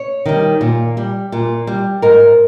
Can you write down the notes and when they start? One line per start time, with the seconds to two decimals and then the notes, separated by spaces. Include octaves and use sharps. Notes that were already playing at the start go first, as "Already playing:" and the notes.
Already playing: C#5
0.25 D#3 G3
0.61 A#2
0.97 G3
1.32 A#2
1.67 G3
2.02 G#2 A#4